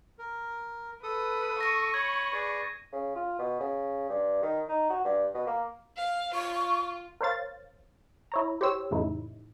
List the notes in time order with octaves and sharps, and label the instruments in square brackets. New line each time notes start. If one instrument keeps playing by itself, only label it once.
[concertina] A#4
[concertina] A4 D#6 [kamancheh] B4
[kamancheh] C#6 [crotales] A#6 D#7
[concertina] C#5 B5 [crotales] G#6
[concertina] G#4 B4 D5
[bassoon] C#3
F4
B2
C#3
G2
D#3
D#4
F#4
G2
B2
A#3
[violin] F5
[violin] F4 [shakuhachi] C#6
[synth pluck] A#4 C5 C#5 F5 A6
E4 C#5 A#5
G4 C5 C#5 E6
F2 A2 C#3 E3 D#4 E4